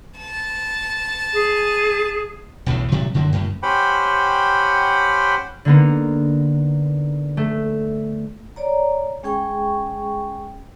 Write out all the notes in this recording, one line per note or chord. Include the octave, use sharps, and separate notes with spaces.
A5
G#4
B1 E2 A2 C#3
A2 C3 F#3 G3
F#2 D3 F#3 A#3
F#2 A2 C#3
C#4 G4 C5 F#5 G5 B5
D3 A#3 B3 D#4
A3
C#5 D5 A#5
G#3 C#4 G#4 G5 C#6